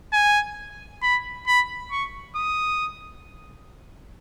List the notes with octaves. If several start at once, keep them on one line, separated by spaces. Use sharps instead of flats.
G#5
B5
B5
C#6
D#6